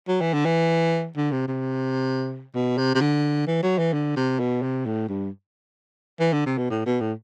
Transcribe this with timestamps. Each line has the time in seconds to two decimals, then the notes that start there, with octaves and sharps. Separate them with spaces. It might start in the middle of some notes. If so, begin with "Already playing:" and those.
0.08 F#3
0.21 E3
0.33 D3
0.45 E3
1.16 D3
1.31 C3
1.48 C3
2.55 B2
2.77 C3
2.95 C3
3.01 D3
3.47 E3
3.63 F#3
3.78 E3
3.93 D3
4.16 C3
4.39 B2
4.62 C3
4.86 A2
5.09 G2
6.20 E3
6.33 D3
6.46 C3
6.58 B2
6.70 A2
6.86 B2
7.01 A2